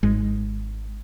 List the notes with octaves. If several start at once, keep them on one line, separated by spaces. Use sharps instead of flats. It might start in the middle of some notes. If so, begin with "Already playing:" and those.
G#1 G#2 G#3